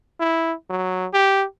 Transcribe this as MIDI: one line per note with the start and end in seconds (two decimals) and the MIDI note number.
0.20 0.53 64
0.70 1.06 54
1.14 1.45 67